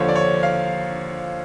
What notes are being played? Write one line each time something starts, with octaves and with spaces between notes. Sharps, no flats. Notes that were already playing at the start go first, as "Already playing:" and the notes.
Already playing: D#2 D3 F3 C#5
D5
C#5
F5